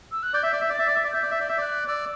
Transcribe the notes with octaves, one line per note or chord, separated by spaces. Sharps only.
E6
F#6
D5 G6
E5
D5
E5
D5
A6
E5
D5
E5
D5
E5 G6
D5
E5
D5 G6
E5
D5 F#6
D5 E6